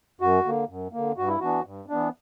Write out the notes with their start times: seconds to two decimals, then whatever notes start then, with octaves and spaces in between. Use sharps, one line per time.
0.21 F#2 F#4
0.45 D3 A#3
0.68 F#2
0.93 D3 A#3
1.17 G2 F#4
1.28 E4
1.40 E3 B3 D4 F#4
1.65 G2
1.89 E3 B3 D4